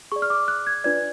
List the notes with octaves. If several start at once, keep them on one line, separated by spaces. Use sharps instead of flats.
G#4 D5 C#6
F6
D6
F#6
G#6
D4 F4 B4 D5 G#6